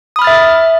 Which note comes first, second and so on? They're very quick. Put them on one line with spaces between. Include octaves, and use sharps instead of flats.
D#6 B5 F6 A6 E5